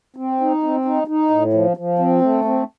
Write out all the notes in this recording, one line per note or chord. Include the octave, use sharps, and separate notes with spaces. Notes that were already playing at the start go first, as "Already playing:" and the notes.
C4
D#4
C4
D#4
D#4
A2
F3
F3
C4
A3
C4